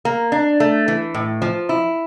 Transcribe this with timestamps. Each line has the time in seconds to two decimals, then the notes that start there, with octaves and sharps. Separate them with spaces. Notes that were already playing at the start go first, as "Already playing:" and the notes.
0.05 A#3
0.32 D4
0.60 A3
0.88 E3
1.14 A2
1.42 F3
1.69 E4